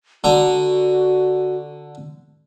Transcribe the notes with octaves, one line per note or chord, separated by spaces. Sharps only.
D3 F#4 A#5